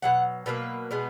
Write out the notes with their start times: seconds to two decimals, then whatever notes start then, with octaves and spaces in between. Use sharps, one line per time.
0.02 B2 F#3 F#5
0.46 B2 F#3 A#3 B4
0.91 B2 G#3 B3